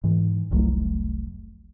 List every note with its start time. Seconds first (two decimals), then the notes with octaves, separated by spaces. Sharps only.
0.04 G#2 E3
0.51 F1 C2 F#3 A3